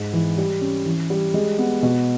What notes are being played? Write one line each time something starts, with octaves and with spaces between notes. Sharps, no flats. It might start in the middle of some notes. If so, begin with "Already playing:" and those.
Already playing: G#2
E3
G3
C#4
E3
G3
G#3
B3
B2